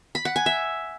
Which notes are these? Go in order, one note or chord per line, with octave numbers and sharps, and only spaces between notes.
B5
F#5
G#5
E5